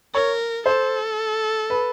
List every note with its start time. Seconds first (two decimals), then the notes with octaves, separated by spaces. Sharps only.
0.14 A#4 C#5
0.66 A4 C5
1.70 B4